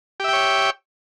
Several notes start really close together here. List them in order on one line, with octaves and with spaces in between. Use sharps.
G4 E5 G5 C#5